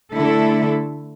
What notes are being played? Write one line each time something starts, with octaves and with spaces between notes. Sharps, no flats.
D3 A3 E4 A4